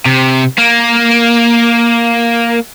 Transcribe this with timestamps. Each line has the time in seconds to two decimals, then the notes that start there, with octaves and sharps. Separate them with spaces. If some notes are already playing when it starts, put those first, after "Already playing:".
0.06 C3
0.58 A#3